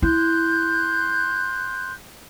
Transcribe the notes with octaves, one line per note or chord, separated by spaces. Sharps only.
E4 C6 F#6 G6